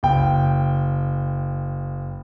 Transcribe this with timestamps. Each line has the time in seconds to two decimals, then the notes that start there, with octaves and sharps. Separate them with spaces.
0.03 F#1 G5